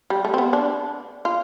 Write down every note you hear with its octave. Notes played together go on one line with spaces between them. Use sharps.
G3
A3
C4
B3
D4
F4